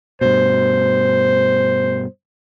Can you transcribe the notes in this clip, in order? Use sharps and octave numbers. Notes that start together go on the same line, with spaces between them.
G2 B2 C5